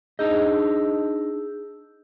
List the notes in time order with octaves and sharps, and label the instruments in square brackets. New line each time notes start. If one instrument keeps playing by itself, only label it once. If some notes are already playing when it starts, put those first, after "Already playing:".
[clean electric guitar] D4 D#4 D#5 [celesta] G#4 E6 G6